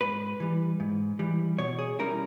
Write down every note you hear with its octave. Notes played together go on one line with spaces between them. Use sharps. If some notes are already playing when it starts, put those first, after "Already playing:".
G#2 B4
E3 G3
G#2
E3 G3
B2 C#5
G#4
G3 C#4 E4 A#4